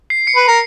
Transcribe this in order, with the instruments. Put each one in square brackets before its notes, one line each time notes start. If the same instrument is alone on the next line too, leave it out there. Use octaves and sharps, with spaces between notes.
[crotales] C7
C#7
[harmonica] B4
A#4